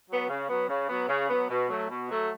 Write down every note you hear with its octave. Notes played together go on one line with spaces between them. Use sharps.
F#3 B3
C#3
F#3 B3
C#3
F#3 B3
C#3
F#3 B3
B2
F#3 A3
B2
F#3 A3